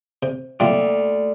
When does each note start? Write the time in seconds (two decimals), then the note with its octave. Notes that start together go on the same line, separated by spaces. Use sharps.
0.23 C3 C5
0.60 C2 F#3 A3 A#3 F4 D5 E5 G5